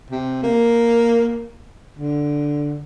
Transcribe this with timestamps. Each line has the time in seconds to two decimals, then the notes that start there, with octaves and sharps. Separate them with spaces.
0.11 C3
0.43 A#3
1.99 D3